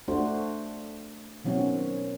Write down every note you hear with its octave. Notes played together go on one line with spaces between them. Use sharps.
A3 D4 F#4 C5
B2 D#3 F#3 C4 C#4 F#4